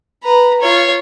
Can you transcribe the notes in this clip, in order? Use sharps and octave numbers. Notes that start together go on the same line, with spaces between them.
B4 A#5
F4 C#5